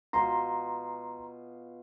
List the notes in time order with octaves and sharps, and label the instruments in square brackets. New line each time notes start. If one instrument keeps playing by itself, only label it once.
[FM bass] C#2 [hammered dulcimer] B2 F4 [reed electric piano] A#5 C6